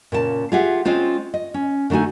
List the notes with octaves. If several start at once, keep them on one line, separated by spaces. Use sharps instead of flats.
A#2 C#3 A5
F4 G4 G#4 E5 F#5
G#3 C4 C#4 F4 C5
D#5
C#4
D3 A3 D#4 F#4 G#5